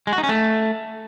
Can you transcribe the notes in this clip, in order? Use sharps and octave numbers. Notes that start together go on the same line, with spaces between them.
G#3
F#4
D#4
C#4
A3